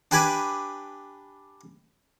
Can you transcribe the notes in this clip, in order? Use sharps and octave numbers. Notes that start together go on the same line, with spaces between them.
D4 G4 B4 G#5 B5 D6